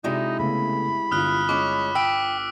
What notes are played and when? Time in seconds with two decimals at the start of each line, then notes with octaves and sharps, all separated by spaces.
0.04 C3 G#3 D#4 E4 F#4 D5
0.39 C#3 A3 B3 B5
1.11 G1 F4 D#6 F6 F#6
1.49 G#3 C#4 D6
1.95 G5 E6 B6 D7